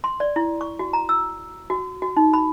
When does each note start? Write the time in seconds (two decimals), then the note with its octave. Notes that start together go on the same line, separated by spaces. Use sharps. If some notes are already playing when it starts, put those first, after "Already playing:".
0.04 C6
0.20 D5
0.36 E4
0.61 C#6
0.79 F#4
0.93 A#5
1.09 E6
1.70 F#4
2.02 F#4
2.17 D#4
2.34 B5